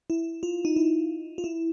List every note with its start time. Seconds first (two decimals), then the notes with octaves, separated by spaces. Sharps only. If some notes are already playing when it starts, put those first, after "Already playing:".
0.10 E4
0.43 F4
0.65 D#4
0.76 E4
1.38 F4
1.44 E4